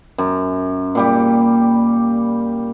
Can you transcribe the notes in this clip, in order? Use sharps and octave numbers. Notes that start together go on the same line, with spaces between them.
F#2
A#2 G3 G4